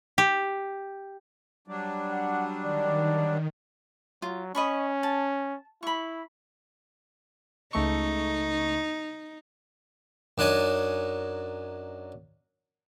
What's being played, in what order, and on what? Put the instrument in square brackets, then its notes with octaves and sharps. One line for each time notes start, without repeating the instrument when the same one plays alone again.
[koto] G4
[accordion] F#3 G3 D4
[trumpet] F#5
[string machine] D#3 [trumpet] D5
[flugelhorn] F#3 [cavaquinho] F4
[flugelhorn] C#4 [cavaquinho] D#5 B5 C#6
[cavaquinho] A5
[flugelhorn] E4 [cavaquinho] B5 C#6
[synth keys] C#2 A3 C#6 [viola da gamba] D#4
[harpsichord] F#2 D4 D#4 G#5